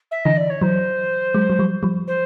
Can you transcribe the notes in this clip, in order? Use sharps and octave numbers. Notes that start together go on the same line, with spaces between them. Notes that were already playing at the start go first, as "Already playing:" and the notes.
E5
D3 E3 D#5
D5
C#5
E3 F#3 C5
F#3 G#3
F#3
F3 G3
F3 G3
C5